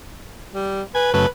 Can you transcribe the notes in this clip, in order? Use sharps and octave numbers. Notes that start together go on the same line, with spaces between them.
G3
B4 G#5
F#2 C#3 A3 B4